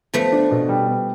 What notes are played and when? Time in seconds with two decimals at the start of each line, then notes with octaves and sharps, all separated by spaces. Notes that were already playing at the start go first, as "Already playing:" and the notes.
0.14 F3 A3 B3
0.33 D4
0.51 B2
0.69 G3
0.88 B3